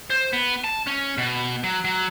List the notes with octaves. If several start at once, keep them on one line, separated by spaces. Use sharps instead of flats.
C5
B3
A5
C#4
B2
F#3
F#3